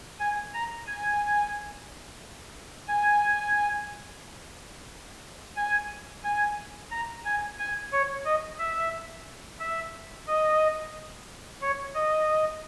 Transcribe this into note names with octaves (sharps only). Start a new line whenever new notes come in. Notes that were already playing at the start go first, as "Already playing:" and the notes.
G#5
A#5
G#5
G#5
G#5
G#5
A#5
G#5
G#5
C#5
D#5
E5
E5
D#5
C#5
D#5